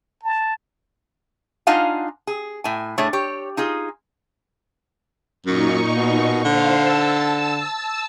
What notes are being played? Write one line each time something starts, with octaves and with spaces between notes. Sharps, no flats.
A5
D4 D#4 F4 F5 F#5 G#5
G#4
A2 G#5
A2 A3 D4 G#4 C#5
G4 C#5
D#4 F4 G#4
F#2 A#2 D#4 C#6
B2
D3 C5 F5
A5 E6